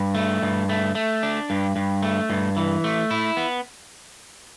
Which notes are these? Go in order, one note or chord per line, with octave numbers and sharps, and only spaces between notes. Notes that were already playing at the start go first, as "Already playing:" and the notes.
Already playing: G2
A3
G2
A3
A3
D4
G2
G2
A3
G2
E3
A3
E4
B3